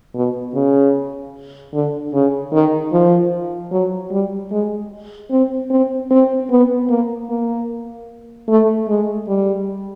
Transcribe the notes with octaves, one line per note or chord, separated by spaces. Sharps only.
B2
C#3
D3
C#3
D#3
F3
F#3
G3
G#3
C4
C4
C4
B3
A#3
A#3
A3
G#3
G3